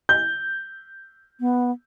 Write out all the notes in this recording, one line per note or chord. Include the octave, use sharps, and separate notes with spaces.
G6
B3